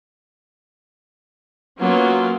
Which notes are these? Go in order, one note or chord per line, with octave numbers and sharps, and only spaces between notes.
F#3 A#3 B3 C#4 F4